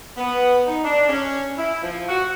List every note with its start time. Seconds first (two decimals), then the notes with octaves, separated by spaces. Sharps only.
0.18 B3
0.67 D#4
0.84 D4
1.09 C#4
1.58 E4
1.83 F3
2.09 F#4